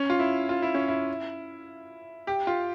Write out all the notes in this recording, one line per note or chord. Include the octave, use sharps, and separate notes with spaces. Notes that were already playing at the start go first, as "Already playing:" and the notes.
Already playing: C#4
F4
E4
F4
E4
C#4
E4
G4
F4